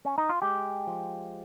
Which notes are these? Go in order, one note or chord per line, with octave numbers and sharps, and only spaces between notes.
C#4
D#4
F4
G#3 G4
F3